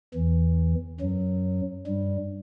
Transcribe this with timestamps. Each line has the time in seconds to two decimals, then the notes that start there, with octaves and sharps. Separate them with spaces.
0.14 E2 E3
1.01 F#2 F#3
1.87 G2 G3